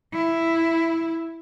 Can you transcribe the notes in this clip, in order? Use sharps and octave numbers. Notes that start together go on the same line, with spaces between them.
E4